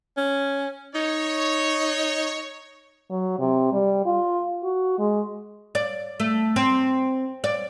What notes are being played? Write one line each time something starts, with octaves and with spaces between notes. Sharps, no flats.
C#4
D#4 C#5
F#3
C3
G3
F4
F#4
G#3
D5
A3
C4
D5